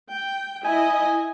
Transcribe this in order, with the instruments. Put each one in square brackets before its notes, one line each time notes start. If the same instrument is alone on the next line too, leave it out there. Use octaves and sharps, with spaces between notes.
[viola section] G5
[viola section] E4 D#5 [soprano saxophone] G#5